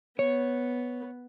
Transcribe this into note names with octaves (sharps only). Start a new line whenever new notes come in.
B3 C#5